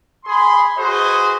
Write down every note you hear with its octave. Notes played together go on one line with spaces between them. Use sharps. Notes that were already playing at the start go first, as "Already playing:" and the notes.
G#4 B5 C6
F#4 G#4 B4 C5 D#5